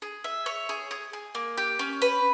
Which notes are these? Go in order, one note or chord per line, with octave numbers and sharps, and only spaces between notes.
G#4
E5
C#5
G#4
G#4
G#4
A#3
G4
C#4
B4